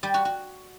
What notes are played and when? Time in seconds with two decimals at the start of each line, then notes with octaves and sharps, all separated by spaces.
0.03 G3
0.14 F#4
0.25 F#4